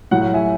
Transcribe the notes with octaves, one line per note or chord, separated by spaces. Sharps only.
A2 F#3 F#5
F#5
E5 G#5